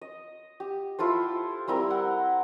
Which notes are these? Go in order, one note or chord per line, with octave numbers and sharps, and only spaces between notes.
D#5
G4
E4 F4 A4 C5
G3 C4 E4 A#4
F#5